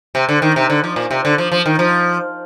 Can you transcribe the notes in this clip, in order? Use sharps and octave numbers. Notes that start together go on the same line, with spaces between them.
C3
D3
D#3
C3
D3
F3
A#2
C3
D3
F3
F3
D#3
F3